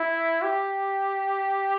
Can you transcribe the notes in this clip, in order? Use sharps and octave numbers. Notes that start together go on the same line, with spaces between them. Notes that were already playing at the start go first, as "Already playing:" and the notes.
Already playing: E4
G4